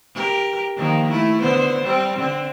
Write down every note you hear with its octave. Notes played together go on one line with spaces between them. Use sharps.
G4 A#4
D#3 F3 A#3
A3 E4
D3 B3 C5
G3 C4
D3 C4